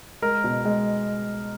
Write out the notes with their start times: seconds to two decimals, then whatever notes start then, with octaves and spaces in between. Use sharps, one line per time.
0.22 G#3 A#4
0.44 B2
0.65 G#3